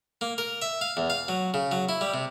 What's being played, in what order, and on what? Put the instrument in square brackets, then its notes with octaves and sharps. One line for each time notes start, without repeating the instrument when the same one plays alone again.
[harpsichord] A#3
A#4
E5
F5
E2
F5
F#3
C#3
F#3
E4
G3
C3